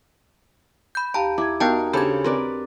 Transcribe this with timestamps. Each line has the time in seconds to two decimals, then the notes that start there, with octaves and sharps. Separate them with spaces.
0.95 B5 G6
1.14 D#2 G4 F5 A5 A#5
1.38 E4 D6 G#6
1.60 B3 D#4 F#4 A#4 F5 G5 A5 G6
1.94 C#3 D4 G4 A4 C5 B5 G#6
2.24 C4 A#4 B4 D5